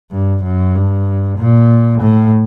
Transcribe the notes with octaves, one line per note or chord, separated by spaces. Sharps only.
G2
F#2
G2
A#2
A2